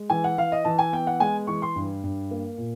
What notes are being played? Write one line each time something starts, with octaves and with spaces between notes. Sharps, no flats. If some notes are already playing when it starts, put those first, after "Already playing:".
Already playing: G#3
E3 G#5
F#5
E3 F5
D#5
E3 A5
G#5
B3 G5
F#5
G#3 G#5
E3 C#6
C6
G2
G2
A#3
A#2